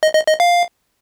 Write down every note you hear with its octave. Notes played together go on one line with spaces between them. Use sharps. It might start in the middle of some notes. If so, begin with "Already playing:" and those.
D#5
D#5
D#5
F5